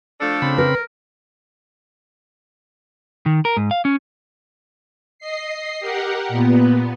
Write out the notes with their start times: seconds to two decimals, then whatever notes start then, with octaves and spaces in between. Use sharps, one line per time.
0.20 F3 A3 D4 A4
0.42 C#3 C4 B5
0.58 A#4 B4
3.26 D#3
3.45 A#4
3.57 G#2
3.71 F5
3.85 C#4
5.19 D#5 C7
5.80 G4 A#4 F#5
6.29 A#2 B3